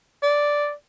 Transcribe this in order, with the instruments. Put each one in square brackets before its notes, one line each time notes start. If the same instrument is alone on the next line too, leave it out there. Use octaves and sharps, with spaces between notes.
[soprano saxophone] D5